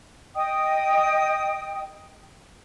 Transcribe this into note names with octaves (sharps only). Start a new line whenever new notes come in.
D#5 G5 D#6